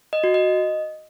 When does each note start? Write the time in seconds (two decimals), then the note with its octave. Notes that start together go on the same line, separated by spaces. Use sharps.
0.13 D#5
0.24 F#4
0.34 D#5